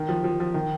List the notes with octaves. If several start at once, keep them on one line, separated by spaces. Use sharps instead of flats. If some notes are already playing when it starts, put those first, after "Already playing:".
Already playing: D#3
F3
F3
F3
D#3